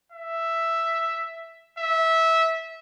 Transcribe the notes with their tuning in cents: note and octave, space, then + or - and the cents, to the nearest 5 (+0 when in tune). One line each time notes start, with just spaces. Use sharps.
E5 +5
E5 -15